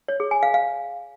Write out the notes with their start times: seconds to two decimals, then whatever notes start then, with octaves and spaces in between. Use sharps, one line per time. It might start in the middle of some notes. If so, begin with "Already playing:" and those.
0.08 C#5
0.20 G#4
0.31 G#5
0.43 F5
0.54 F5